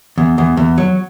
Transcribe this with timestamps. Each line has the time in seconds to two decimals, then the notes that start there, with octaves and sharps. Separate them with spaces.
0.18 E2
0.38 E2
0.57 E2
0.78 F#3